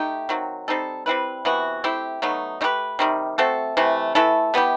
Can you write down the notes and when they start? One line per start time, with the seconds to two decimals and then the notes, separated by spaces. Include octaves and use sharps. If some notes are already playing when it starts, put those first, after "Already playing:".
Already playing: A3 D#4 G4
0.29 D#3 F#3 C4
0.68 G3 C4 D#4 A4
1.06 G3 C4 E4 B4
1.45 C3 E3 B3 F#4
1.84 A3 C4 E4 G4
2.22 B2 F#3 A3 D#4
2.61 A3 D#4 G4 B4
2.99 C3 D#3 G3
3.38 A3 C4 F#4 A4
3.77 C3 E3 A3
4.15 E3 A3 E4 A4
4.54 G3 B3 E4 G4